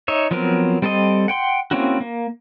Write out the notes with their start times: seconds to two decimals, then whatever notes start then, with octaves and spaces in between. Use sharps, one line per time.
0.08 D#4 C#5 E5
0.31 F3 F#3 B3 C4 A#4
0.82 G3 C4 A4 C5 D#5
1.28 F#5 G5 C6
1.71 A#3 C4 C#4 E4 F#4
2.01 A#3